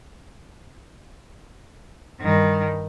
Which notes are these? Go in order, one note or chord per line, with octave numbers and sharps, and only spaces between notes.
G2 D#3